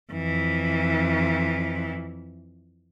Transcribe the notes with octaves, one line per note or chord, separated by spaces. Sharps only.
F2 E3